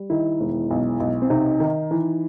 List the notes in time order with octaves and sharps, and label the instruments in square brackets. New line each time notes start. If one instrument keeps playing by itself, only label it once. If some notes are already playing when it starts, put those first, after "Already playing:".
Already playing: [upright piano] G3
[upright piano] D#3 [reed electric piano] E4
[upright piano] E1
B1
B1
[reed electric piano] C4
[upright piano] C3 [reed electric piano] D#4
[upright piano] D#3
E3